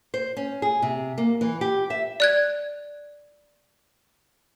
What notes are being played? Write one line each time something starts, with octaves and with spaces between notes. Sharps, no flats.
C5
C#4
G#4
C3
A#3
E3
G4
E5
D5 F#6 G#6